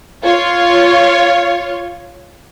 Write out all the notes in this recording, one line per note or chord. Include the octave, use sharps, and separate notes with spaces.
F4 C#5